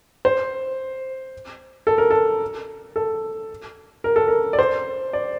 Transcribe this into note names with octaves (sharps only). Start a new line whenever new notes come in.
C5
A4
A#4
A4
A4
A#4
A4
A#4
D5
C5
D5